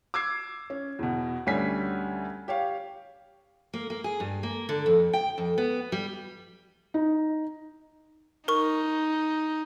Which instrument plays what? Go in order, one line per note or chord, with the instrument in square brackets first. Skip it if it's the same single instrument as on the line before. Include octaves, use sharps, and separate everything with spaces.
[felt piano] D6 E6 G#6 C7
C#4
E2 B2
D2 G3 C#4 G#5 B6
G4 C#5 F5
[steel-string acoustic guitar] A#3
A#3
G#4
G2
A#3
D3
F2
G5
F2
B3
G3
[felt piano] D#4
[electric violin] D#4 [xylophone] A#4 C#6